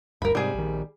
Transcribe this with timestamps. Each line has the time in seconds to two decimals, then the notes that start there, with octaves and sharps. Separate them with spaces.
0.22 G1 D2 G2 A#4 B5
0.35 G#2 C3 G3 G#4
0.54 A#1 D#3